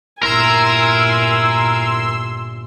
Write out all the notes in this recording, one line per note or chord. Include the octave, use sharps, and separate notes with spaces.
G1 A#2 E4 A#4 G#5 C6 E6